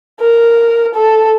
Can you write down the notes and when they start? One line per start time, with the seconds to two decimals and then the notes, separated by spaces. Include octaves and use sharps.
0.21 A#4
0.94 A4